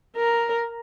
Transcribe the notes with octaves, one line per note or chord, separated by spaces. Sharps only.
A#4